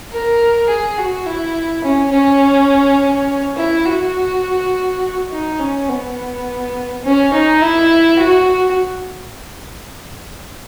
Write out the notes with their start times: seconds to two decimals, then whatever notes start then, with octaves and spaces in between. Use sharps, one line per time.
0.11 A#4
0.69 G#4
0.98 F#4
1.26 E4
1.84 C#4
2.12 C#4
3.57 E4
3.86 F#4
5.31 D#4
5.60 C#4
5.89 B3
7.04 C#4
7.33 D#4
7.62 E4
8.19 F#4